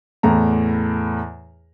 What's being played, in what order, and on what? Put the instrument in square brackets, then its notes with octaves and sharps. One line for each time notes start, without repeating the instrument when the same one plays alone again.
[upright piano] E2 A2 A#5